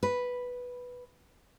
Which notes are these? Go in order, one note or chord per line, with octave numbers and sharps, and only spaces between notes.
B4